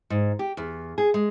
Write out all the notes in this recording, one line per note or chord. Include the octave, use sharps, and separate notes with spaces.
G#2
G4
E2
G#4
G#3